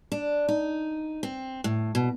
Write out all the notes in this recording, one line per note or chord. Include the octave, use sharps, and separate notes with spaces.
D4
D#4
C4
A2
B2